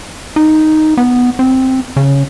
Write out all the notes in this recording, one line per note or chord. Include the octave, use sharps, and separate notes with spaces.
D#4
B3
C4
C#3